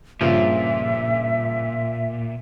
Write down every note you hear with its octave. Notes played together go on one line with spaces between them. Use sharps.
G2 A#2 C#3 F3 E5